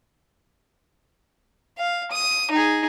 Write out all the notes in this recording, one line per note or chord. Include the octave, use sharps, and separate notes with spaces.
F5
D#6
D#4 G#4